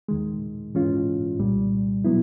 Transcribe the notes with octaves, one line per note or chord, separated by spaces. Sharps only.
D#2 D#3 G#3
G#2 E3 G#3 C#4 F4
C2 A#2 G3
B2 F#3 B3 E4